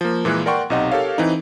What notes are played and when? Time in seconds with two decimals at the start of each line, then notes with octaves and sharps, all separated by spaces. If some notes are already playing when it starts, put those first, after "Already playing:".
0.01 F3 A#3
0.25 A#2 E3 G#3 A#3 F#6
0.46 A#4 D5 F#5 G5 C6 C#6
0.70 B1 C3 D#4 D#5 F#5
0.92 G4 A4 A#4 C#5 F5
1.18 E3 C4 D#4